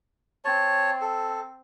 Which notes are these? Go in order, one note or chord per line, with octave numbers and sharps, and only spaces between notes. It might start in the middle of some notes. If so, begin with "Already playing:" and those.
C4 C#5 A5
A4